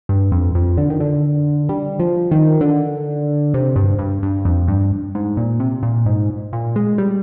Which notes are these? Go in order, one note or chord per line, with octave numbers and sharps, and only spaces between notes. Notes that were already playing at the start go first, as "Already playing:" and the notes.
G2
F2
F2
D3
D#3
D3
G3
F3
D#3
D3
C3
G2
G2
G2
F2
G2
G#2
A#2
C3
A#2
G#2
A#2
G#3
G3